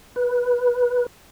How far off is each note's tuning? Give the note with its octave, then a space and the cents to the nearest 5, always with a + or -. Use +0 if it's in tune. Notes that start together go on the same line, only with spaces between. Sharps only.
B4 -15